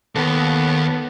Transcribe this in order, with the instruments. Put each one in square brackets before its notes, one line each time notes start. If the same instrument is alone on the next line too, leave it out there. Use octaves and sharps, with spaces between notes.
[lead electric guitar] D#2 [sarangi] B3 [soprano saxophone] A4